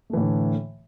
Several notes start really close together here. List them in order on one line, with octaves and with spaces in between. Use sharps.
A3 E3 A2 D3